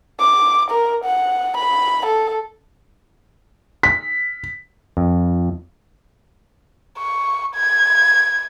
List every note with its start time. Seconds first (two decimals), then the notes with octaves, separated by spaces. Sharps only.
0.20 D6
0.71 A#4
1.04 F#5
1.57 B5
2.06 A4
3.83 B6
4.97 F2
6.99 C#6
7.56 G#6